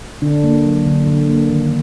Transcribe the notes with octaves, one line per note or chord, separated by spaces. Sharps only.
D3 D4
A#3
F#3
D3
D3
A#3
D#3